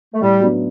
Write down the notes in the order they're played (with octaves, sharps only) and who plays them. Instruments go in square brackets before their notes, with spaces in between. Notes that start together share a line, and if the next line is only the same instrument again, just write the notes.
[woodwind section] A3
[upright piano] A2 [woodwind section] G3
[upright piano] F#3 B3 D4